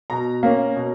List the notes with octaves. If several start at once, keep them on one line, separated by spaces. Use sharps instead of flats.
B2 A#5
A#3 C#4
B2